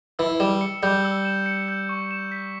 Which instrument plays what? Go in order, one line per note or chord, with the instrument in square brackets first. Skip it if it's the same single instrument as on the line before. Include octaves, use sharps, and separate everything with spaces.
[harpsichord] E3 [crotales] E6
[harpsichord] G3 [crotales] E7
[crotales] C#7
[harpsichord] G3 [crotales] G6
[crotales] E6
E7
C#7
G6
C#6
E7
B6